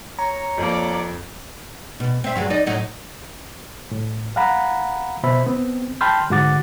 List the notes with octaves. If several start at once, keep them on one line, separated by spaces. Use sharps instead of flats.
C#5 A#5
F2 A#3 D5
B2
C4 E5
G2 F#3 G#3
D#4 D5 D#5
A2 F#3 D#4
A2
F5 F#5 A#5 B5
B2 C5 E5 B5
B3 C4
G5 A5 B5 C6 F6 G6
G#2 D3 F#4 F#5 D6 A6